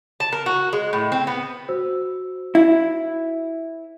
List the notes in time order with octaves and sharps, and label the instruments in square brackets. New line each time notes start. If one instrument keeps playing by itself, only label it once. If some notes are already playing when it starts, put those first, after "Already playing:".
[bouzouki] A5
A#4
F#4
G#3
A2
C4
B3
[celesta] F#4 C5 E6
[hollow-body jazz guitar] E4